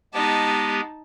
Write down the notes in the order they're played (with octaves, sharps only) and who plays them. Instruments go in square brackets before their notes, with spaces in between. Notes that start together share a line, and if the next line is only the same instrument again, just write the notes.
[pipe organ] G#3 B3 G4 [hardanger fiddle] D#4 A5